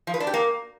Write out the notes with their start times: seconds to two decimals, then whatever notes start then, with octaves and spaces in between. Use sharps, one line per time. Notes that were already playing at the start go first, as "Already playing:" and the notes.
0.07 F3
0.14 B4
0.20 D4
0.27 G4
0.34 A#3